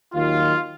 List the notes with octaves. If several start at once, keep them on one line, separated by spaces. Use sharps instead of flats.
D#2 D#3 F#3 F4